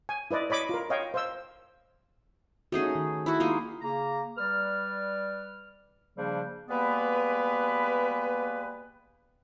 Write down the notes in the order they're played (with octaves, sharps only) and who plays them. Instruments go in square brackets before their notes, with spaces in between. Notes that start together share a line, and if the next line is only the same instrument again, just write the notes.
[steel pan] G#5
E4 B4 D5 D#5
C#5 D#5 B5 D6
F4 A#4
C#5 D#5 F5 G5
C5 F5 E6
[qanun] A3 D#4 G#4 [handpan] C#4 F#4
[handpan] D#3
[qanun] E4 F#4
[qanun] G#3 A#3 D#4 [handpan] F4
[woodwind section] C#3 A#3 A#5
G3 B4 D5 F6
C#3 F3 G3 A#3 D4 C5
G3 G#3 A#3 B3 B4